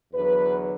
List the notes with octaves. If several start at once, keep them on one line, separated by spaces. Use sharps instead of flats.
E2 D3 F#3 B4